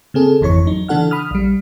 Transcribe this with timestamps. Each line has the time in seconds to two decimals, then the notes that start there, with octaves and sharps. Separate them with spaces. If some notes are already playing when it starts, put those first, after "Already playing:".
0.14 C#3 C4 G#4 A4
0.41 G#1 F2 E3 C#5 C#6
0.65 F#3 D#4
0.88 C#3 E3 D4 A4 F#5 F6
1.11 B5 D#6 F6
1.31 A#1 G3